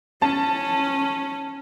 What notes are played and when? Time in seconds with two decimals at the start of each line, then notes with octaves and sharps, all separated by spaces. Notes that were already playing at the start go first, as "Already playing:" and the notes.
0.22 C#4 A5